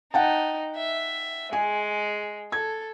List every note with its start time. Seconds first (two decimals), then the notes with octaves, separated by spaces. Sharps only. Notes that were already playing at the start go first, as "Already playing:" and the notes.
0.14 D#4 F#5 G5 A5
0.77 E5
1.53 G#3 G#5
2.52 A4 G#6